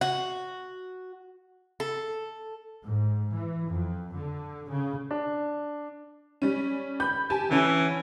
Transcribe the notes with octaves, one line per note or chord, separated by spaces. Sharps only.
F#4
A4
G#2
E3
F2
D3
C#3
D4
G3 C#4
B5 G6
G4 G#5 A5
D3 E3 C#4